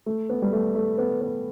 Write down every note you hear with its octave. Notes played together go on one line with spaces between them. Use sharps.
A3
B3
G3
A3
A3
B3
B3